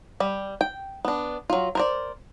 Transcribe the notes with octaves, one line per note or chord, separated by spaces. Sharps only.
G3 G4
G5
B3 D4
F#3 F4
A#4 C5 D5